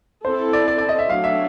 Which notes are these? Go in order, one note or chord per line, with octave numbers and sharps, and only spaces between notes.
C4 E4 A4 C5
D5
D5
D5
D#5
E5
F#3 A3 D4 F5
E5